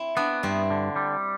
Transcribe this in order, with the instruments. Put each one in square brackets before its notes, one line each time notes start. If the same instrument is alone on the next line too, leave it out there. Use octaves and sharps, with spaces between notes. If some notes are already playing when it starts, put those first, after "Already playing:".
Already playing: [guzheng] C4 E4
[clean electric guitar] B3 [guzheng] D4 F#4
[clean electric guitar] G2 [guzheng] C4 E4
[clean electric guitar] D3
G3